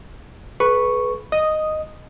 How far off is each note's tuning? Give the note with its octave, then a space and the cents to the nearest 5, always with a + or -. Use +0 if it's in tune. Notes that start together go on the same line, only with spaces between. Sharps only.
G#4 +45 B4 +0 C#6 +0
D#5 -5 D#6 +0